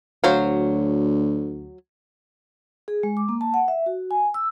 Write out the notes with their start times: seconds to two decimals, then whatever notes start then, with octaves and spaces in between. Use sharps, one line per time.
0.24 D2 F#3 C5 F5
2.88 G#4
3.03 G#3
3.17 D6
3.29 A#3
3.41 A5
3.54 F#5
3.68 E5
3.86 F#4
4.11 G#5
4.34 E6